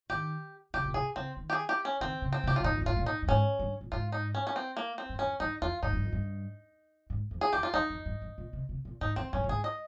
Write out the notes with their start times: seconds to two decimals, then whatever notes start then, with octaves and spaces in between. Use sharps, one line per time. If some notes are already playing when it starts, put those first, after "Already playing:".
0.10 D#3 G4
0.74 C#3 G4
0.85 A#2
0.94 C3 G#4
1.16 C#3 C4
1.37 D#3
1.50 G4
1.53 G#4
1.69 G4
1.85 C#4
2.01 D#3 C4
2.22 C#3
2.33 C4
2.44 C3
2.47 G4
2.56 F4
2.60 C3
2.64 A#2 D#4
2.73 F2
2.81 G2
2.86 G#2 F4
2.97 A#2
3.06 D#4
3.22 G2
3.28 G#2 C#4
3.59 G2
3.81 A#2
3.92 G#2 F4
4.12 D#4
4.35 C#4
4.47 C#4
4.56 C4
4.77 A#3
4.98 C4
5.09 G2
5.19 F2 C#4
5.40 G2 D#4
5.62 F2 F4
5.83 G#2 D#4
5.93 G2
6.02 F2
6.12 G2
7.10 G#2
7.31 F2
7.41 G#4
7.53 F2 G4
7.63 F4
7.73 F2 D#4
7.90 F2
8.06 G2
8.22 G2
8.38 A#2
8.53 C3
8.69 C3
8.85 A#2
9.01 G#2 D#4
9.16 F2 C4
9.33 G2 C#4
9.44 A#2
9.48 G#2 G#4
9.64 D#5